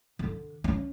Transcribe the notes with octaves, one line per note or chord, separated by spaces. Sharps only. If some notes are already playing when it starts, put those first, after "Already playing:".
D3
C#4